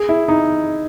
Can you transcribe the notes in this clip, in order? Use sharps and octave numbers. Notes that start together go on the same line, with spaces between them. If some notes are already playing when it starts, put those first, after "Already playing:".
Already playing: G#4
E4
D#4